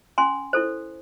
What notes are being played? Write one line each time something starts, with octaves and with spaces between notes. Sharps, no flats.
C#4 G#5 C6
E4 A4 C5